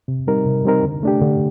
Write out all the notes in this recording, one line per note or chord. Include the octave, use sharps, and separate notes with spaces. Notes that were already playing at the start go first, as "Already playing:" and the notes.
C3
G3 C4 D#4 A#4
C3
G3 C4 D#4 A#4
D3
A3 D4 G4
D3